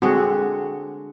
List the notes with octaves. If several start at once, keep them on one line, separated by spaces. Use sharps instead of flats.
D3 G#3 C4 F#4